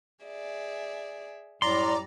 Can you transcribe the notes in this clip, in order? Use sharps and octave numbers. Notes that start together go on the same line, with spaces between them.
G#4 D5 E5
F#2 A2 G3 D5 A#5 C6